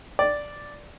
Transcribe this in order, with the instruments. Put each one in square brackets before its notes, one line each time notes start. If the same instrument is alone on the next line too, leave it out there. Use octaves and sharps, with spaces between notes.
[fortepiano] D5